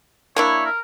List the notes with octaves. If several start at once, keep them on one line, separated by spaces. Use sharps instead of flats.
A#3 D4 E4 C#5
A#4